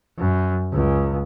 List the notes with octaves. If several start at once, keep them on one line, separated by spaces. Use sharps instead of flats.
F#2
C#2